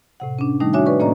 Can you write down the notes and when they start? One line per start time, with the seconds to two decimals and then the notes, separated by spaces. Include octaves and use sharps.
0.20 A2 C3 F#5
0.39 C#4 D4
0.60 D#3 G3 A3 D#4
0.73 D4 F#4 C#5 E5 G#5
0.86 B4 D5 C#6
0.99 A2 A#3 C#4 D5 D#5 A#5